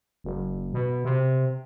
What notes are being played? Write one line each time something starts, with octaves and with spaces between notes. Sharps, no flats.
F#1
B2
C3